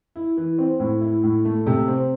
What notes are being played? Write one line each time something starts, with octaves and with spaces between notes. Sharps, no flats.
E4
E3
C4
A2
E4
A2
A3
C3
C4